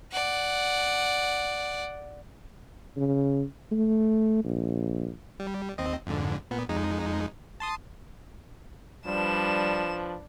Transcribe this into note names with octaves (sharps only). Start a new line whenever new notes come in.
D5 F#5
C#3
A3
A#1
G3
D#2 C4 D#5
F2 G#2 D3
A#2 B3
F2 G#3 D#4
A5 C6 D#6
F3 G3 D4 B4 E7